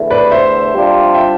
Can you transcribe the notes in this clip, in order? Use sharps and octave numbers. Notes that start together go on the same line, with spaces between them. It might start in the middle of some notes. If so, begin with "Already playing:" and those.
Already playing: E2 D3 A3 E4
B4 D5
C5 E5
C3 G3 D4 F4
E5 G5